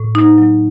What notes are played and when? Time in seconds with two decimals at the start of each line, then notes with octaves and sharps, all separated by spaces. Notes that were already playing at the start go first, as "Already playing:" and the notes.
Already playing: A2
0.15 A#3 D#4
0.38 F#3